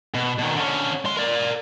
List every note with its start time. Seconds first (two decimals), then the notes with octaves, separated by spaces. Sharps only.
0.14 B2
0.39 B2 D#3
0.56 D3 C#4
1.05 G#3 C6
1.17 A#4 D5